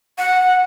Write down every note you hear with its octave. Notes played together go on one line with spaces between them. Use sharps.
F#5